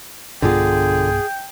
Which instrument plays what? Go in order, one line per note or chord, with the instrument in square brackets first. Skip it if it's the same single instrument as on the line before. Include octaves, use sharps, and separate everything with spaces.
[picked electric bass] B1 G2 B3 [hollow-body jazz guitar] D3 F4 [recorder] G#4 [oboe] G5